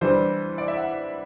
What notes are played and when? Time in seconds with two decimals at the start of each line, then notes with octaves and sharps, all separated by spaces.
0.01 E3 G3 D4 C5
0.58 D5
0.68 E5
0.77 F#5